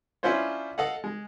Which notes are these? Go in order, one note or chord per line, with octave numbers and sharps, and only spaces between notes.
C#4 D4 E4 F4 C5 C#5
A4 D#5 F5 F#5
G#3